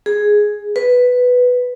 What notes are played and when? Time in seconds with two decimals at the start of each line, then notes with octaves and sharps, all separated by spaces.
0.06 G#4
0.76 B4